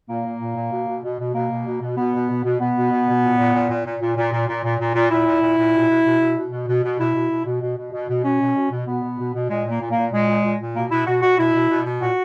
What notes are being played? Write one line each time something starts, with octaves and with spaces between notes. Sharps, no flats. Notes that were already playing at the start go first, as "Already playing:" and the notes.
A#2 A#3
A#2
A#2
A#2
B2
B2
B2
B2
B2 A#3
B2
B2
B2
B2 B3
B2
B2
B2
B2 B3
B2
B2
B2
A#2
A#2
A#2
A#2
A#2
A#2
A#2
A#2
A#2
A#2
A#2
A#2
A#2 E4
A#2
A#2
A#2
B2
B2
B2
B2
B2
B2
B2
B2
B2 E4
B2
B2
B2
B2
B2
B2
B2
B2 C#4
B2
B2
B2
B2 B3
B2
B2
B2
A#2 G#3
A#2 A#3
A#2
A#3
A#2
A#2 G#3
A#2
A#2
A#2
B2 A#3
B2 E4
B2 F#4
B2 F#4
B2 E4
B2
B2
B2
A#2 F#4